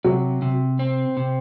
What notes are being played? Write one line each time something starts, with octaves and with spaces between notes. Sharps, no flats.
C3 F#3
C3
C4
C3